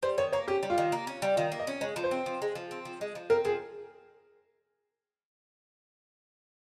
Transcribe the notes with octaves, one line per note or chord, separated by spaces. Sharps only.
G3 C5
D#3 C#5
A#3 C#5
C#4 G4
G3
F4
D#3
A#3
C#4
G3
D#3 F4
A#3
D#5
C#4
G#3 C#5
F3
C5
C4
F3
G#3
F3
C4
F3
G#3
F3
C4 A#4
F3 G#4